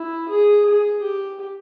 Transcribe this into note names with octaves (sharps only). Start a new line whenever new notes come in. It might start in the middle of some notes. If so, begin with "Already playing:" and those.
Already playing: E4
G#4
G#4
G4